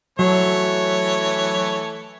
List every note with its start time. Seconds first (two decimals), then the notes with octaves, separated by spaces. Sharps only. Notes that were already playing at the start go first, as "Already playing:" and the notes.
0.19 E3 F#3 A3 C#5